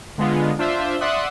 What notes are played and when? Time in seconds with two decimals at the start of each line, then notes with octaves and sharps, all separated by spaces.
0.18 D3 G#3 B3 F4
0.58 D4 F4 C5 E5
1.01 D5 E5 F#5 C6 D#6 F#6